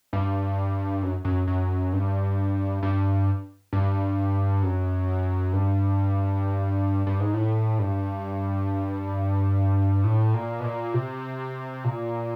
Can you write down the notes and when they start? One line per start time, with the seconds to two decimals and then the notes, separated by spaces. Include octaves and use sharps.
0.13 G2
1.03 F#2
1.25 F#2
1.47 F#2
1.93 G2
2.83 G2
3.73 G2
4.63 F#2
5.53 G2
7.07 G2
7.20 G#2
7.34 A2
7.79 G2
10.04 A2
10.34 A#2
10.59 B2
10.64 A#2
10.94 C3
11.84 A#2